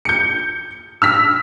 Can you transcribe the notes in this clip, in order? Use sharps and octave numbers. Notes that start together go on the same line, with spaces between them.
G6 C#7
E6 F6 B6